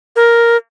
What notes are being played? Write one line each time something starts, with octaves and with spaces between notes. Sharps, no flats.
A#4